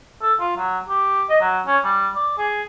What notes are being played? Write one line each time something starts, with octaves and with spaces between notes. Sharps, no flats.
A4
F4
F#3
G4
D#5
F#3
C#4
G3
D5
G#4